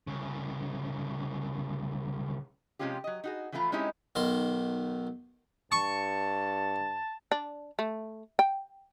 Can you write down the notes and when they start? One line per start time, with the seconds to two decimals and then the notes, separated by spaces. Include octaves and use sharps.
0.07 C2 C#3
2.79 C3 F3 G#3 C#4 F4 G4
3.04 F#3 D#5
3.24 D#4 F#4 G#4
3.52 E3 F3 A3 E4 F4 A#5
3.72 G#3 C4 C#4 D#4 E4 G4
4.15 B1 D#3 C6
5.72 G2 A5 C#6
7.32 D4
7.79 A3
8.39 G5